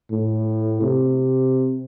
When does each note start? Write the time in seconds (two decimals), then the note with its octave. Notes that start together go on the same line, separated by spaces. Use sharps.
0.11 A2
0.82 C3